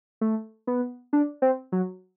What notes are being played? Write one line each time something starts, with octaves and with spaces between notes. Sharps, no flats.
A3
B3
D4
C4
F#3